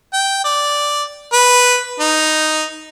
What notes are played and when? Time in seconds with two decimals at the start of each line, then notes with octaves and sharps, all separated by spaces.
0.13 G5
0.44 D5
1.33 B4
2.00 D#4